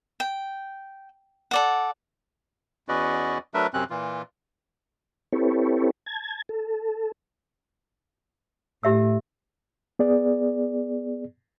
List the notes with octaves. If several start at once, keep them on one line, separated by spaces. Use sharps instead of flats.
G5
A4 D5 F#5
E2 C#4 F#4 B4 D5 D#5
F#3 A3 D4 A#4 B4 E5
F#2 C3 C4 C#4 F#6
A#2 E3 F4
C4 E4 G4 A4 B4 C#5
A5 G#6
A4
A2 G4 E5 E6
B3 G#4 D5